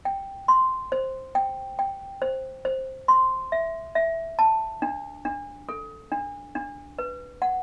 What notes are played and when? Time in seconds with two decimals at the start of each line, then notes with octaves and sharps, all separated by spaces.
0.05 G5
0.48 C6
0.92 C5
1.35 G5
1.79 G5
2.22 C5
2.65 C5
3.08 C6
3.52 E5
3.95 E5
4.39 A5
4.82 D4
5.25 D4
5.69 A4
6.12 D4
6.55 D4
6.99 B4
7.42 F#5